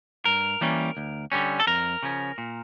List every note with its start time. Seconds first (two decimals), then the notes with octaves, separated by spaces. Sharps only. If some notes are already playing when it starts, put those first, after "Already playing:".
0.25 G2 A#4
0.61 E3 G3 A#3 C#4
0.97 D2
1.32 D3 G3 C#4
1.60 A4
1.67 F2 A#4
2.03 C#3 F3 C#4
2.38 A#2